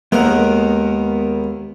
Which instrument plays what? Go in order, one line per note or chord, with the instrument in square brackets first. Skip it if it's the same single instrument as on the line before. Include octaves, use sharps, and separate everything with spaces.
[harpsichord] D#2 A#4 [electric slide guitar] G#3 B3 F#5